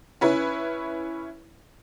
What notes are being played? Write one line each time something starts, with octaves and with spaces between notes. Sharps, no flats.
C#4 E4 B4